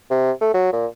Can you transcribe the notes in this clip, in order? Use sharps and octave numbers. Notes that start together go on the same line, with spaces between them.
C3
A3
F#3
A#2